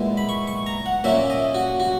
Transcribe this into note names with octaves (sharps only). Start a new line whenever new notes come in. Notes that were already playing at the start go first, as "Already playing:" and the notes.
Already playing: A#2 G#3 B3 E4
B5
C#6
C#6
A#5
F#5
A#2 A#3 C#4 E5
D#5
F#4
F#4